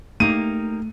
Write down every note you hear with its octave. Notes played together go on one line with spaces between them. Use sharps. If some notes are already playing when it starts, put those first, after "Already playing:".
A3 A#3 D#4 G4 D#7